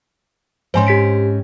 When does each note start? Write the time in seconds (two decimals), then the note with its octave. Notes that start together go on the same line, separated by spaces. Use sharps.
0.74 G#2 C4 C#4 C5 G#5 C6
0.87 G4 B6 D7